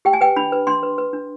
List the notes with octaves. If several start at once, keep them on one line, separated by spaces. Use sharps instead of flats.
G4 G5
G#5
B4 G5
D4 B5
B4
D4 C6
B4
B4
D4